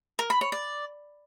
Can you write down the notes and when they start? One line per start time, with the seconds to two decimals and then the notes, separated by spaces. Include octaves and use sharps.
0.19 A#4
0.30 B5
0.41 C#5
0.52 D5